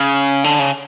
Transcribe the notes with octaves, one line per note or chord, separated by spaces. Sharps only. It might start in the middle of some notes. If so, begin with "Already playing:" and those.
Already playing: C#3
D3
C#3